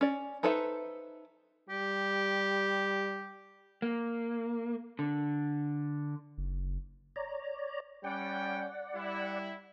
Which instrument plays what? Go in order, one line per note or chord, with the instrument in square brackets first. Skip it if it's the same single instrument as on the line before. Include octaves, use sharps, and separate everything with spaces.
[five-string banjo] C#4 D5
D#4 A4 B4 C5 E5
[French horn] G3 [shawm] G4
[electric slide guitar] A#3
D3
[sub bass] F#1
[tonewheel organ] C#5 D5 A#5
[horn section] G3 C#4 G5 [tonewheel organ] D5 F#5
[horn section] G3 E4